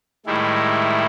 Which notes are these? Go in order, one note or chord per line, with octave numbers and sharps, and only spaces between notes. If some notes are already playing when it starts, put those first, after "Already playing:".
A2 D#3 G3 G#3 E4